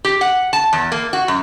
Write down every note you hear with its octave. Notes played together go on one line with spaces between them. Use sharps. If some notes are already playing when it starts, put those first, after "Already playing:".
G4
F#5
A5
E2
A#3
F#4
F#2